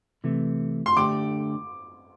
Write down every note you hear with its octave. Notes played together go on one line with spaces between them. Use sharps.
C3 E3 A3
C6
D3 A3 D4 G4 D6